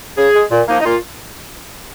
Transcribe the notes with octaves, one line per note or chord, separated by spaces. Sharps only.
C#3 G#4
G#3
A#2
F3 A#3 D#4
D#4
A#2 F4